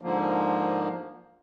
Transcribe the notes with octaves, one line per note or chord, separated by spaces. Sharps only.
G#2 D3 F3 A#3